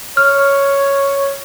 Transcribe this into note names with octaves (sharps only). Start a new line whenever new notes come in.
C#5 F6